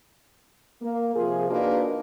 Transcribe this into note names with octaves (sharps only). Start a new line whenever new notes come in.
A#3
C3 F3 F4 G#4
A#3 D4 D#4 F4 F#4 B4